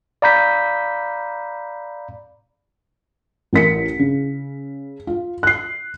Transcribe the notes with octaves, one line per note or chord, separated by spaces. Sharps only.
D5 F5 A#5 B5 G6 B6
A1 A#4 B6 C#7
C#3
F4
F#6 C7